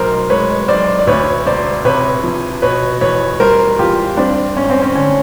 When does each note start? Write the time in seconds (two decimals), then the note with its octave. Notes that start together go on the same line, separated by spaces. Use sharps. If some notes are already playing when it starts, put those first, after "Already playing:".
Already playing: B1 B2 A#4 C5
0.30 G#3 B4 C#5
0.68 B1 C5 D5
0.99 D5
1.07 D2 B4 C#5
1.46 E1 C5 D5
1.85 C3 B4 C#5
2.24 F3
2.62 B2 B4 C#5
3.01 E2 B4 C#5
3.40 G3 A#4 C5
3.79 E2 F4 G4
4.17 G2 C4 D4
4.57 G#1 C#4
4.70 C4
4.82 C#4
4.95 D3 C#4